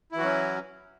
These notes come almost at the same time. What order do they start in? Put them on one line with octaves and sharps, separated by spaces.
E4 E3 F#4 F#3 C#4